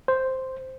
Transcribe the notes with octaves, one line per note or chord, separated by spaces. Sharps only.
C5